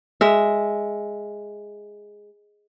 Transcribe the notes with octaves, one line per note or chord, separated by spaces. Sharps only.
G#3 E5